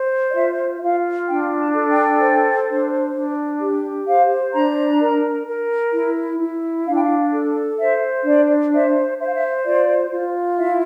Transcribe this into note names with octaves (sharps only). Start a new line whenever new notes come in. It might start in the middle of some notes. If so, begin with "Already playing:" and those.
Already playing: C5
D5
F4 E5
E5
F4 F5
D4 G5
A5
A4
G5
C5
D4
D4
G4
C5 F5
D4 A#5
A#4
A#4
E4
E4
D4 F5
G5
F5
A4
C5 E5
D4 D5
C5 E5
C5 E5
F5
E5
F4 D5
F4
E4 E5